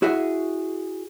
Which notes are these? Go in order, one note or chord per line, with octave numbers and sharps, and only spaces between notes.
E4 F#4 G#4 E5